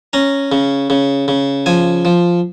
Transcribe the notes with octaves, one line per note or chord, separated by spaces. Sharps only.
C#4 A#5
C#3
C#3
C#3
F3 G#5
F3